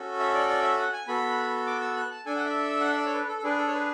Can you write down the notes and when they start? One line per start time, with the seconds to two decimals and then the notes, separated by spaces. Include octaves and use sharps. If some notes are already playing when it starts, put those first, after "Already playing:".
Already playing: C#4 F#4 A4
0.19 E5
0.34 D5
0.49 D5
0.63 E5
0.78 F#5
0.93 G#5
1.08 B3 F#4 A4 B5
1.67 D6
1.81 E6
1.96 F#6
2.11 A5
2.26 D4 A4 G#5
2.36 F#5
2.45 E5
2.81 F#5
2.88 E5
2.97 D5
3.06 C#5
3.14 B4
3.29 A4
3.39 A4
3.44 D4 G#4 B4
3.58 A4
3.68 C#5
3.73 B4